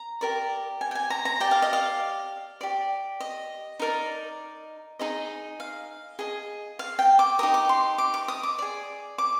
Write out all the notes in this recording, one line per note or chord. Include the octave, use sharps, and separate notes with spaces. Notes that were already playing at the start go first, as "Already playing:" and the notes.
Already playing: A#5
G4 A#4 D5
G#5
G5
G#5
A#5
A#5
G4 D5 G5
F5
D#5
F5
G4 D5
D#5
D#4 A#4 D5
D#4 G#4 D#5
F5
G#4 D#5
F5
G5
D6
D#4 G4 A#4 D#6
D6
C6
D6
D6
D#6
D6
G#4 D5
D6